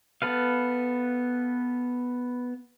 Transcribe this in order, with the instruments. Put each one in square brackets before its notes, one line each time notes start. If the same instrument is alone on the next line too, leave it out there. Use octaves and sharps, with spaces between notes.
[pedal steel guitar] B3 A4 B4 F5